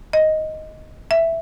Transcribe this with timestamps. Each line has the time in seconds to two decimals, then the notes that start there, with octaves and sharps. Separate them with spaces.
0.13 D#5
1.11 E5